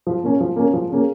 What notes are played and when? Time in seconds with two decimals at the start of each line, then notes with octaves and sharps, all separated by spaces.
0.07 F3
0.24 A#3 C#4
0.40 F3
0.56 A#3 C#4
0.73 F3
0.90 A#3 C#4 G#4